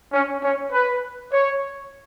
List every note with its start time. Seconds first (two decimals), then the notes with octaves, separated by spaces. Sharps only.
0.12 C#4
0.42 C#4
0.71 B4
1.32 C#5